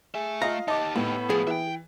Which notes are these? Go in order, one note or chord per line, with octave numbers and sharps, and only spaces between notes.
A3 G#4 E5
F4 D#5 F5 A#5
D#4 G4 D#5 A5 D6
A2 B3
G#2 F3 G#4
E3 E5 G5